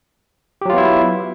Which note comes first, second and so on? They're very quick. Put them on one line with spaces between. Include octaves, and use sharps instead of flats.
G4 F#3 F4 B3 E4